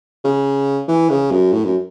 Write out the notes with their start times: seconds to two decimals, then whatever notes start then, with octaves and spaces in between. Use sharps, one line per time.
0.24 C#3
0.88 E3
1.09 C#3
1.31 F#2
1.52 A2
1.64 F#2